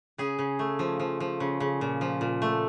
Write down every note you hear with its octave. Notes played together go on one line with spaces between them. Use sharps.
C#3 G#4
C#3
A3
F3
F3
F3
C#3
C#3
A#2
F3
A#2
A3